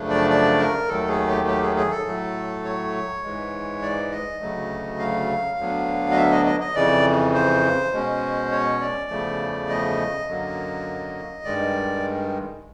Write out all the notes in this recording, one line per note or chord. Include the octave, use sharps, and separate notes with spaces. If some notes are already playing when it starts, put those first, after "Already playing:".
Already playing: F#2 C#3 F3 A3 D4
D5
D5
A#4
D#2 D#3 F#3 A3 A4
G#4
G4
G4
G#4
G#4
A4
A2 F#3 A3
C#5
G#2 E3 G#3
D5
D#5
D2 C#3 F#3 A3
F5
D2 D3 F#3 B3 D4
D#5
E5
D#5
D#5
D#5
F2 C#3 E3 D5
C5
B2 G#3 C#4
C#5
D5
E2 C#3 F3 A3
D#5
F#2 D3 F#3 A#3
G2 D#3 G#3 D5